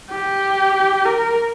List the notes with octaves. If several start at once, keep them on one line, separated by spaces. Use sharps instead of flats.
G4
A#4